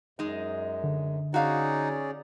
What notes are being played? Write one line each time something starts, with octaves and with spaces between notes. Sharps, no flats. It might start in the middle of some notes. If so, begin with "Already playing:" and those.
F#2 G#3 D#4
D3
C#4 D#4 F#4 G#4 D5 F5